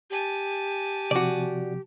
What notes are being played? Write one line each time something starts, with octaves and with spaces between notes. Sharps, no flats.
G4 G#5 A5
C3 F3 F#4 D5